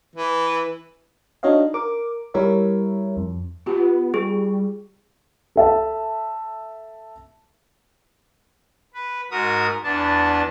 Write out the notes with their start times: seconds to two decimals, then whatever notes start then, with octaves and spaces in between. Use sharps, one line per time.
0.16 E3
1.43 D4 D#4 F#4 C#5 D#5 F5
1.74 A#4 D6
2.34 G3 E4 A#4 C#5 E5
3.17 F2
3.66 B3 F4 G4
4.14 G3 G#4
5.56 A4 E5 A5
8.94 B4
9.31 G#2 F#4 A#4 D#6
9.84 E2 B3 D4 A5